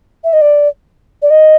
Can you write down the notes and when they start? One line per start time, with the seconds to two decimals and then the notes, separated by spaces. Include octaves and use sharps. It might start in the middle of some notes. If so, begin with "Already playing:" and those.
0.24 E5
0.33 D#5
0.41 D5
1.22 D5
1.30 D#5